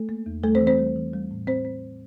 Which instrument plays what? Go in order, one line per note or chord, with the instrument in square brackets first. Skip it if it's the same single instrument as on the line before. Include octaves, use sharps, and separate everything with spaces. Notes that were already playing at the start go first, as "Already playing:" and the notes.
Already playing: [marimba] A3 A4
A#3
E2
G3 A3 A4
C4 C5
E3
C4 C5
G3
E3
G3
A2
C4 C5
C4